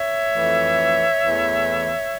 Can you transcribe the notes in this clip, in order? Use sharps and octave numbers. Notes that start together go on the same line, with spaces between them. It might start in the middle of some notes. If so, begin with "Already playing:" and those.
Already playing: C#5 E5
F2 E3 A3
E2 E3 A3